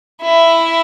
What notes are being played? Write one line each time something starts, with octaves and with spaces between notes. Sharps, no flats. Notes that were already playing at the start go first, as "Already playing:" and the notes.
E4